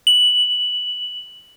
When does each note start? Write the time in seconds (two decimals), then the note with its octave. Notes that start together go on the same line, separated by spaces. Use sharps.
0.07 F#7